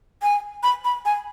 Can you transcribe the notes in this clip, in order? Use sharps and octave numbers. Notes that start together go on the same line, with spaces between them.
G#5
B5
B5
G#5